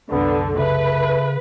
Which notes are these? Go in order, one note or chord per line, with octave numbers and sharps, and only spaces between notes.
C2 F#2 D3 B3
C#3 A3 B4